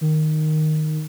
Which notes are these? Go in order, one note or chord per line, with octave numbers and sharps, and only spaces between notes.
D#3